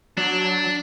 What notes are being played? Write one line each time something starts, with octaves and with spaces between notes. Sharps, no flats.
F#3 D4